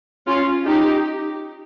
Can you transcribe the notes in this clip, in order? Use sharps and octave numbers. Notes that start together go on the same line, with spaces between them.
C#4 F4
D#4 G4